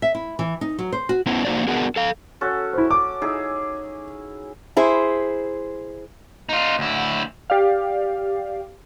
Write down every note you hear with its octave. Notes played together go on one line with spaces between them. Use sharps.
E5
E4
E3
D#4
F#3
C5
F#4
B3 C#4 E4 C5
A#3 D#4 F#4 C5 D5
B3 D4 F#4 G#4 A#4
A4 F5
C#4 F#4 A4
E4 C5
D6
D#4 E4 G#4
E4 G#4 C5
D#4 F4
D2 E4
G4 D5 F5